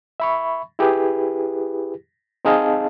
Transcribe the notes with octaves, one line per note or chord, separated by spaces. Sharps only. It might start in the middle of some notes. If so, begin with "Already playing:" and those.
E5 B5 C#6
E4 G4 G#4 B4
C4 D#4 G#4 D#5 F5 A5